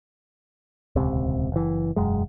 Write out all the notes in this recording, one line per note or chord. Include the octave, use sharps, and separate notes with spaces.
D#1 C#2 C3
F#1 E3
E1 F#2 G#3